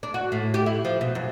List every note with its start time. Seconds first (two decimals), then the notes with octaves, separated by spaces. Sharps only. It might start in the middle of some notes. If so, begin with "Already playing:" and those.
0.03 D4
0.14 F#4
0.32 A2
0.54 G4
0.66 E4
0.85 F3
1.01 B2
1.15 F#2